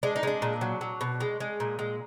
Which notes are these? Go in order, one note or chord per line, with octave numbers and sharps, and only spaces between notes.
G#3 D4
D#4
G#3 D4
A#2
F#3
F#3
B2
G#3
G#3
A#2
G#3